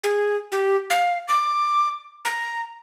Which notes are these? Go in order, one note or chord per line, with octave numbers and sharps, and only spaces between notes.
G#4
G4
F5
D6
A#5